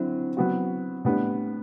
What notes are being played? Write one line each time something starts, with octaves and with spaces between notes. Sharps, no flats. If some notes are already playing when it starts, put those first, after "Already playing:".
Already playing: D3 F#3 C4 E4
F#3 B3 F#4
A2 G3 B3 D4